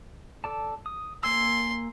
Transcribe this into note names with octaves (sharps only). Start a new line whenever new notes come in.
A4 D5 A5
D#6
A#3 G#5 C6 E6